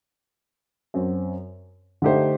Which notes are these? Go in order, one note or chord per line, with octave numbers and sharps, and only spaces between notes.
F#2 F#3 C4
D3 A3 D#4 G4 C5